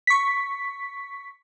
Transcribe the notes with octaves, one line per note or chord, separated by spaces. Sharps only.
C#6 B6